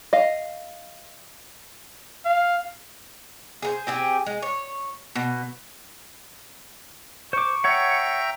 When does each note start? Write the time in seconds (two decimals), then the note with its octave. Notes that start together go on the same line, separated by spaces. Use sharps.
0.13 D#5 F5
2.26 F5
3.62 G#4 A#4 C5
3.87 C4 G4 G#4
4.26 G#3
4.42 C#5
5.15 B2
7.33 C5 C#6 D6
7.64 C#5 E5 F#5 G5 A#5